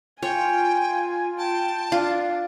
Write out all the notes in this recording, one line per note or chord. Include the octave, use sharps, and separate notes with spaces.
F4 C#5 G5 G#5
G5 A5
D4 F4